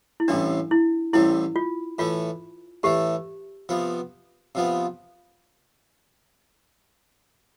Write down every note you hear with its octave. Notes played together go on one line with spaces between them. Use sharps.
E4
A1 A2 G3 C4 D4
E4
A1 A2 G3 C4 E4
F4
A2 E3 A3 F4
A2 E3 A3 G4
C3 F3 B3
C3 F3 B3